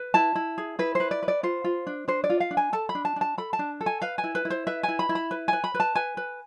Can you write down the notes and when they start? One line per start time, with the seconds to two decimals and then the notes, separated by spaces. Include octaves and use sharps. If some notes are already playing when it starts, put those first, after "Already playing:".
Already playing: B4
0.14 E4 A5
0.35 E4
0.58 G#4
0.79 E4 B4
0.95 B4 C5
1.11 D5
1.23 B4
1.28 D5
1.43 F4 C5
1.64 F4
1.87 D4
2.08 D4 C5
2.24 D5
2.30 F4
2.40 F5
2.51 D4
2.57 G#5
2.73 A4 A5
2.89 B5
2.95 D4
3.05 A5
3.16 D4 A5
3.38 A4 B5
3.53 A5
3.59 D4
3.81 A4
3.86 G#5
4.02 B4 F5
4.18 G#5
4.24 E4
4.35 B4
4.45 E4
4.50 C5
4.67 B4 E5
4.83 G#5
4.88 E4
4.99 B5
5.09 E4
5.15 B5
5.31 B4
5.48 B4 G#5
5.64 B5
5.74 B4
5.80 A5
5.95 B4 G#5
6.17 B4